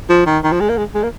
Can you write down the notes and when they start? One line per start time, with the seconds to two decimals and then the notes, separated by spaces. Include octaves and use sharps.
0.09 F3
0.26 D#3
0.44 D#3
0.52 F3
0.60 G#3
0.69 A#3
0.77 G#3
0.94 G#3
1.03 A#3